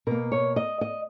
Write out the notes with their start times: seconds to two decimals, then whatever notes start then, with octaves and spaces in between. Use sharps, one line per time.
0.07 B2 A#3 A#4
0.32 C#5
0.56 D#5
0.81 D#5